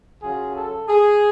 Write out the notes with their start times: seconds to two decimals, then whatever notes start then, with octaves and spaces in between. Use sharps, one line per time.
0.22 F#2 C#3 F#3 C#4 F4 G#4
0.56 A4
0.89 G#4